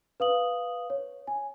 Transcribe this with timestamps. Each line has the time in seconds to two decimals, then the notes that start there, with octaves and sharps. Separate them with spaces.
0.20 B4 F5 D#6 F#7
0.90 C#5
1.27 G#5